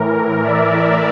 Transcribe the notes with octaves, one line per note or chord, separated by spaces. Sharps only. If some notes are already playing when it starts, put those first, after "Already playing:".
Already playing: A2 E3 A#4
A#4
D5 E5